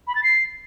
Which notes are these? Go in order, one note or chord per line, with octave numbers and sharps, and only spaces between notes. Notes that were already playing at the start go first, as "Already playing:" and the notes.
B5
A6
C7